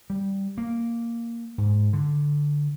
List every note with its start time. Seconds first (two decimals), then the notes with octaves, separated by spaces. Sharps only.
0.10 G3
0.58 A#3
1.58 G#2
1.93 D3